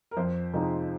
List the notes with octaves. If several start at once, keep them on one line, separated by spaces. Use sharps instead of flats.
A#4
F2 C5
C3 F3 G#3 D#4